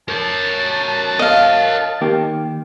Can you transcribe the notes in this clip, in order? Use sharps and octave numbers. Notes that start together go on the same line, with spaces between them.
A#4 C#5 A5
D#5 F5
D#3 A#3 G4